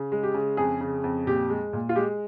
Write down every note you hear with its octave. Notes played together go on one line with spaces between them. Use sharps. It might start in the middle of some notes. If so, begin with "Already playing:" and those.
Already playing: C#3
G#3
G4
C#3
F2 G#4
C#3
F2
A#2 G4
G#3
A#2
F4
G#3 G4